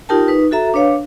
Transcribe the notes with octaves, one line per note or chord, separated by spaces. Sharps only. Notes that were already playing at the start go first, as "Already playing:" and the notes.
D#4 F4 G4 A#4 G5 A5
D#4 B4
F#4 A4 E5 A#5
D4 B4 C#5 F5